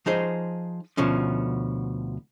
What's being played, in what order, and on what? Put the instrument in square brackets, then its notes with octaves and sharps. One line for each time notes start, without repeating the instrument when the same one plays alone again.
[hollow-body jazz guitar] F3 D#4 G#4 C5
D2 B2 F3 C#4